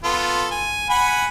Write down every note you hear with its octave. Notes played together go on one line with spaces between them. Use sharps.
B3 F4 A4
G#5
F#5 G#5 B5